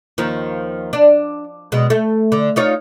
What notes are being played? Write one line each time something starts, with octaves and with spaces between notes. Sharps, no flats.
D#2 D#3 F3
D4
B2 G#3
A3
D3
D#4 F4 C#5